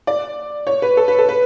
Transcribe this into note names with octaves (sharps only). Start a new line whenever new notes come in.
D5
C#5
B4
A4
B4
A4
B4